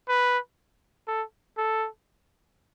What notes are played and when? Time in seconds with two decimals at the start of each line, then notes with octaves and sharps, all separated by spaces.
0.08 B4
1.08 A4
1.57 A4